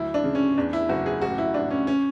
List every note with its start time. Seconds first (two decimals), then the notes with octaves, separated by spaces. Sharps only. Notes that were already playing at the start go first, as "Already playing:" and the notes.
Already playing: D2 F#3 E4
0.14 D4
0.24 C#3
0.35 C#4
0.58 E2 D4
0.73 E4
0.89 F#1 F#4
1.06 G#4
1.22 A1 F#4
1.38 E4
1.54 A1 D4
1.70 C#4
1.87 C#4